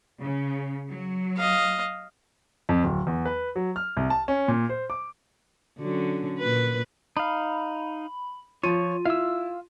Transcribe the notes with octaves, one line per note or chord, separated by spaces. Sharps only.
C#3
F#3
D#5 F5
F2
D1
E2
B4
F#3
F6
C2
A5
C#4
A#2
C5
D6
D3 F#3 C#4
A#2 B4
D#4 F5 B5
F3 F4 C#5 D#7
E4 F5 E6